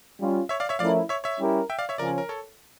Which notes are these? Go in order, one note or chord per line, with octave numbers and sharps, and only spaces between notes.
G3 C#4 F4
C#5 E5
D5 F5
C#5 E5
F3 A3 C#4 E4 A#4 D5 F5
C#5 E5
C#5 E5
G3 C#4 E4 G4 A#4
E5 G5
D5 F5
C#5 E5
C#3 F3 C#4 A#4 D5
A#4
A4 C#5